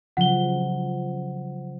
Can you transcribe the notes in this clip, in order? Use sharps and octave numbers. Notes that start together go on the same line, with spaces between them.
C#3 F3 F#3 F#5 G7